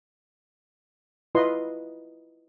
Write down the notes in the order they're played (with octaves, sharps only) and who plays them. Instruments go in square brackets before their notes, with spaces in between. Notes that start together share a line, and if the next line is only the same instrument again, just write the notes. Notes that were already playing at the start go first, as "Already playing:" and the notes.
[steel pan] E4 F4 B4 D#5 C6